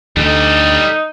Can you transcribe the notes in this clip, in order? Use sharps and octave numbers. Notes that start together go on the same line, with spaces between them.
D2 G3 D#4 A4